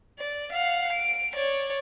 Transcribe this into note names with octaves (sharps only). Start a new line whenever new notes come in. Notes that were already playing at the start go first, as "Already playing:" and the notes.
D5
F5 F#5
D7
C#5 D5